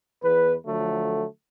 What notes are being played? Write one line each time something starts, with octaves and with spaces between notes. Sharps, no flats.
E2 B4
D3 F3 F#3 A3